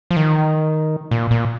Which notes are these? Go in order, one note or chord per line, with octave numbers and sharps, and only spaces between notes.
F3
D#3
A#2
A#2